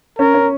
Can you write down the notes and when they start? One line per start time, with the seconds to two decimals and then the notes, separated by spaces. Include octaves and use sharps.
0.19 C#4 A#4
0.34 C#4